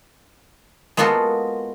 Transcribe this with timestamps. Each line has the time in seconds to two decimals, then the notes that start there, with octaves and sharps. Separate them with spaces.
0.97 G#3 A#3 B3 F4 F#4 A4